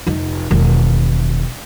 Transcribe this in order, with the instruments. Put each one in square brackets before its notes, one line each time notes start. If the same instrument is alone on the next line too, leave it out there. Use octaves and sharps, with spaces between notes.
[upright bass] F1 D#4
E1 D#3